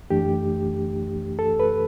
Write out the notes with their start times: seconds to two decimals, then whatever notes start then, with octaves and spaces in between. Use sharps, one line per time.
0.10 F#2 E3 A3 D4 G4
1.39 A4
1.60 B4